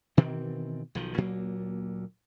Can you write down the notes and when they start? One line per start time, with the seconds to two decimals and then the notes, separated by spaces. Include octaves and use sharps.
0.17 B2 D#3 E3 C4
0.95 B1 D#3 F3
1.18 D2 A#2 F#3 A#3